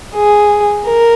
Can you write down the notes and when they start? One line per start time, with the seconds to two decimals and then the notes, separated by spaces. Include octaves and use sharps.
0.15 G#4
0.86 A#4